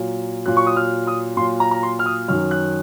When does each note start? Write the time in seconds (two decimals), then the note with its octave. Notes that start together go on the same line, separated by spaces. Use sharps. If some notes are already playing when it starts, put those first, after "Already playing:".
Already playing: A#2 F#3
0.46 A#2 F#3 F#6
0.57 C#6
0.67 D#6
0.76 F6
1.07 D#6
1.37 A#2 F#3 C6
1.60 A#5
1.71 A#5
1.83 C6
1.99 F6
2.06 D#6
2.28 F#2 D#3 F#3 F6
2.51 F#6